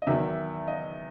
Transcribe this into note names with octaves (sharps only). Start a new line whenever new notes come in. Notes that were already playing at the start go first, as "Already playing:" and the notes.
D#5
E2 D#3 F#3 E5
D#5